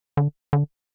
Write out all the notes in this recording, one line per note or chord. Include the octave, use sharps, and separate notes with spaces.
D3
D3